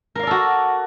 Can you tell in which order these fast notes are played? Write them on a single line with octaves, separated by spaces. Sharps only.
A#4 F5 D5 A4 F#4